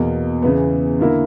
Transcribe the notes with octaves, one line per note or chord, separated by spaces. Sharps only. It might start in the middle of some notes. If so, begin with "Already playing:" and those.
Already playing: E2 B2 A#3
E2 C#3 E3 B3
D3 A#3 E4 A#4